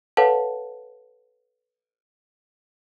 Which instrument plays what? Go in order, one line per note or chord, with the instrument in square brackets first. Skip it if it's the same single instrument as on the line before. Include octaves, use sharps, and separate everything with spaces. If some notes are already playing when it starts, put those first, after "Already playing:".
[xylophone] A4 B4 C#5 F5 F#5 A5